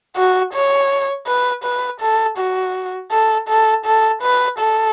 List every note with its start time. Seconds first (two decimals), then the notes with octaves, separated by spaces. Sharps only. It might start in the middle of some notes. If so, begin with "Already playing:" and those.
0.16 F#4
0.53 C#5
1.27 B4
1.64 B4
2.01 A4
2.38 F#4
3.12 A4
3.48 A4
3.86 A4
4.22 B4
4.58 A4